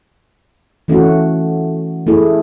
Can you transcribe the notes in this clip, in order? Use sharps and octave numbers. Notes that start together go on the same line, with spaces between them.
E3 A3 C#4 F#4
A3 E4 G#4